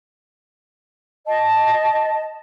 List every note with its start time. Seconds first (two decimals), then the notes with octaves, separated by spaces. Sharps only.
1.26 D#5 A5